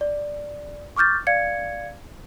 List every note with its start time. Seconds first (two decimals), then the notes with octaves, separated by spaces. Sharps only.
0.01 D5
0.97 C#6 D6 F6 G6 A6
1.27 D5 F5 G#6 C#7